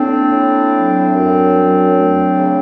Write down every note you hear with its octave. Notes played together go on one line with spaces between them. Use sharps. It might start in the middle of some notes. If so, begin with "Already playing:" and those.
Already playing: A2 A#3 C4 D4
A2
F#3
F#2
F#3
A3
C#3